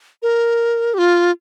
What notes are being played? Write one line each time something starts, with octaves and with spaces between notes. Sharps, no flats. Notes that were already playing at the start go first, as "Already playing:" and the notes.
A#4
G4
F4